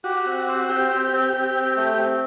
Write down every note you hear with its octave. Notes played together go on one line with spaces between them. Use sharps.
F#4 G4
C4
C5
C4 G4
C4
C4
C4 G4
C4
A3
C4